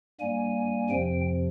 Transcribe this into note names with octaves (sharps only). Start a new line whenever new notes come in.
G2 G3 A#3 G#5
F2 C3 F3 G5